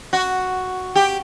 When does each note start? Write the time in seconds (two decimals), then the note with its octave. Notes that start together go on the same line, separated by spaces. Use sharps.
0.13 F#4
0.96 G4